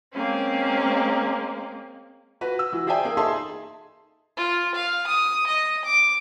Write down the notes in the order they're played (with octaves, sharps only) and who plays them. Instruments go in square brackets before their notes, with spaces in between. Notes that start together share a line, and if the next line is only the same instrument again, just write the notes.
[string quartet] G#3 A#3 C4 C#4
[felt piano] F#4 B4
E6
E3 F#4
G#4 C5 D5 E5 G5 G#5
A#3 G#4
D#4 G#4 A4 E5 A5 C6
[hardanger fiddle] F4
F5
D#6
D#5
D6